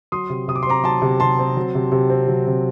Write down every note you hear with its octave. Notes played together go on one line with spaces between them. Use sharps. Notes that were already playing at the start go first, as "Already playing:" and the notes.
F#3 C6 D#6
C3
C3 D#6
D6
C6
C4 A#5 D6
F#3 A5 C6
C3
C3 A5 C6
C4
F#3
C3
C3
C4
F#3
C3